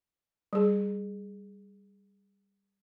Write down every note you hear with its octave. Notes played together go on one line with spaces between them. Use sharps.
G3 G#4